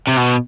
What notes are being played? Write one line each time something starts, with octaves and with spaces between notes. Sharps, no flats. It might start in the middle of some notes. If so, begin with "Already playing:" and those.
C3
B2